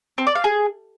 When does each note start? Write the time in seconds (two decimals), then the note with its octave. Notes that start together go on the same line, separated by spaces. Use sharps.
0.18 C4
0.27 D5
0.35 F5
0.44 G#4